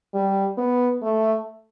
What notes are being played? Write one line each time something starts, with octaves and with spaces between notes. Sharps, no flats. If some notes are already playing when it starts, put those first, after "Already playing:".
G3
B3
A3